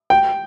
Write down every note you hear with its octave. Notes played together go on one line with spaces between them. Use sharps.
G5